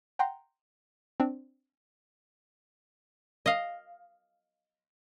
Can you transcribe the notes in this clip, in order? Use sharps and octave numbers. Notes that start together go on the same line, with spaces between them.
F#5 G5 A#5 C6
C4 D4
D#5 F5